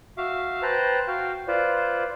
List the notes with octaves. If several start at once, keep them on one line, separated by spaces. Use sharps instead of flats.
F#4 E5 F5 D6
B4 C5 G5 A5 A#5
F#4 F5 G5
F4 B4 C5 D5